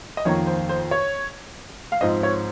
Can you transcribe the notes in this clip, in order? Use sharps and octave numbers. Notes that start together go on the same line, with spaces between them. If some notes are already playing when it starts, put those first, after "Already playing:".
D#5
F2 D#3 A#3 C#5
C5
C5
C#5
F5
G#2 F3 C4 D#5
C#5